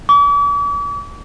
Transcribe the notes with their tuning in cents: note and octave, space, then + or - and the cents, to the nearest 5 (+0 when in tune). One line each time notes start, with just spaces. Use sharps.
D6 -45